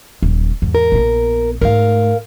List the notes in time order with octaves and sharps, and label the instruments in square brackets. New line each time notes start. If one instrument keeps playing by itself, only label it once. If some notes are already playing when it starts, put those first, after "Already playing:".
[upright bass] D#1 F#3
E2 G#2
[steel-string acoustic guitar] A#4
[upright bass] A#1 B3
[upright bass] G#2 A3 [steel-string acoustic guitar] A#4 F5